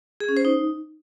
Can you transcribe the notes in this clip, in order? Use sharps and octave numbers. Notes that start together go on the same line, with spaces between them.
G#4
C#4
C5
D#4